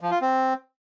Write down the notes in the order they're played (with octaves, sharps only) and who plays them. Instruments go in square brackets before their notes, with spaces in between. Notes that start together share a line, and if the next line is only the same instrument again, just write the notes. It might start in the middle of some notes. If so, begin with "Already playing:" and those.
[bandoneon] F3
F4
C4